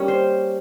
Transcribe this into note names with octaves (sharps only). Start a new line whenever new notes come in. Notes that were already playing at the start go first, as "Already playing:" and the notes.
Already playing: G3 A#3 C#4
C5